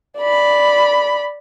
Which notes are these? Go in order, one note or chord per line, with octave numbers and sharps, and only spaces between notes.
D5 B5